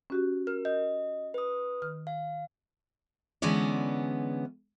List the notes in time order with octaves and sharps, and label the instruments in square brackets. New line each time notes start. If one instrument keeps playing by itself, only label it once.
[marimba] C#4 F#4 G4
[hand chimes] A#4 [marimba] F6
[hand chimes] D#5 [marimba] G6
[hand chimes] B4 D#6
[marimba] D#3 F6
[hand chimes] F5
[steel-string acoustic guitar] D3 E3 G#3 B3 C#4 D5